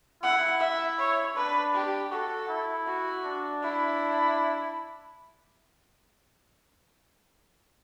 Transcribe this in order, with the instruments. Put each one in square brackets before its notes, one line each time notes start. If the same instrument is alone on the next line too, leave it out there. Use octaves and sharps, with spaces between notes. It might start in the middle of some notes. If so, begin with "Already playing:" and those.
[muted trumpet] E4 [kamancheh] F#5
[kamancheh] E5
C#5
[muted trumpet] D4 [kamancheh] B4
[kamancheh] G4
[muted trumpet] F#4 [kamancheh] A4
[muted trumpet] E4
[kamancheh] F#4
[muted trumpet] D4
[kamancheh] E4